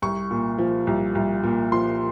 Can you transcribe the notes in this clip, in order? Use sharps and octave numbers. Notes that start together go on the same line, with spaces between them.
C2 C#6
A#2
F3
C2
C2
A#2
F3 C6